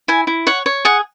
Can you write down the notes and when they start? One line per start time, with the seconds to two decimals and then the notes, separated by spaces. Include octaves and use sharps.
0.08 E4 G#5
0.27 E4
0.47 C#5 F#5
0.66 C#5
0.85 G#4 F#5